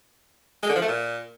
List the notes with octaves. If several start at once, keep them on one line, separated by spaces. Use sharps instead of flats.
G#3
D3
F3
A3
A#2